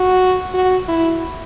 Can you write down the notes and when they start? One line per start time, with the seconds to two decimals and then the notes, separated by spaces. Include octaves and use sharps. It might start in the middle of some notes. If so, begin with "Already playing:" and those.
Already playing: F#4
0.54 F#4
0.88 E4